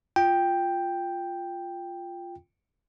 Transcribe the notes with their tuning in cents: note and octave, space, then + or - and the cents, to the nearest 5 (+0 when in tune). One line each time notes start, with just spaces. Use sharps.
F4 +0 G5 +5